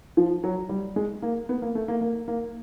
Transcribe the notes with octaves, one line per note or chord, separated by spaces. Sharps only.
F3
F#3
G3
G#3
A#3
B3
A#3
A3
A#3
A#3
A#3